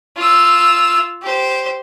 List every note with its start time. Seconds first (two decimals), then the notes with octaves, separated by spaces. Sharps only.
0.17 F4 E6
1.22 G4 C5